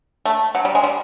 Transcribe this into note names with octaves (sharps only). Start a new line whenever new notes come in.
A3
F#3
G3
G#3
G3